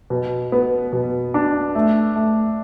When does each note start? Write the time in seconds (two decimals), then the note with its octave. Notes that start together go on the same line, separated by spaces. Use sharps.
0.10 B2
0.52 B3
0.93 B2
1.34 D4
1.75 A3
2.16 A3